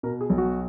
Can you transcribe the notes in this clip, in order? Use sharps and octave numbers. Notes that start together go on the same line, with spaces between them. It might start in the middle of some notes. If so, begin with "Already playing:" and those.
B2 A#4
G#4
B1
F#4